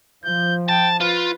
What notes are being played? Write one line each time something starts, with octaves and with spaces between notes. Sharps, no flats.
F3 G6
G5 A5
F4 B4